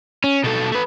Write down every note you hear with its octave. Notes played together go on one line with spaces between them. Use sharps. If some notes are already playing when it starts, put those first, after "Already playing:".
C#4
B2 A4
A3 B4